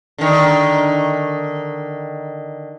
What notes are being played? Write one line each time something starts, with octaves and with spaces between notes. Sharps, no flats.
D3 D#3